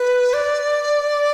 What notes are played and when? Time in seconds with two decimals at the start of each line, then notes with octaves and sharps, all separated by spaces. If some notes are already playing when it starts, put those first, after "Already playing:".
Already playing: B4
0.34 D5